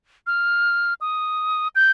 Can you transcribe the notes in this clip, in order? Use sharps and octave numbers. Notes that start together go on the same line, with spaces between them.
F6
D#6
G6